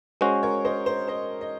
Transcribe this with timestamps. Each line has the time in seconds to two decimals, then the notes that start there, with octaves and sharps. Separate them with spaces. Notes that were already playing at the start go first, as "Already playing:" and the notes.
0.21 G#3 C#4 F#4 C5
0.43 A#4 C#5
0.65 C5 D#5
0.86 C5
1.08 C5 D#5
1.41 D#5